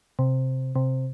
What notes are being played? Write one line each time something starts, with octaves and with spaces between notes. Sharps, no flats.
C3
C3